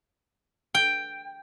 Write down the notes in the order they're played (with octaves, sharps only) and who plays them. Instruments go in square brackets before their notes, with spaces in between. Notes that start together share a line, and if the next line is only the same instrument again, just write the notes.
[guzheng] G5